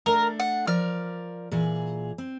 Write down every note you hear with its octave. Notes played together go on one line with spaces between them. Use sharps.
A3 D4 A#4
F#5
F3 A#4 D5 F6
A#2 E3 G#4
C4